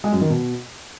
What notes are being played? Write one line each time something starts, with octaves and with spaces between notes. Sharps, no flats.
G#3
F#2
D#3
B2